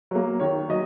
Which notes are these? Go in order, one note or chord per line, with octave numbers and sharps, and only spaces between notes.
F#3 A#3
D#3 C#5
F#3 D#5